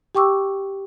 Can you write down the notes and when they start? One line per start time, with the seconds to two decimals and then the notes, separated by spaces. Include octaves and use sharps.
0.15 G4 G5 C#6 D6 E6